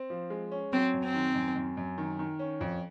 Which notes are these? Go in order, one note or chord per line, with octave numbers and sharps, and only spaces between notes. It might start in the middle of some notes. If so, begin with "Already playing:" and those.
Already playing: C4
F3
G#3
C#4
F#3 C4
F#2
C4
D#3
F#2
F#2
F#2
D#3
D#3
C#4
F2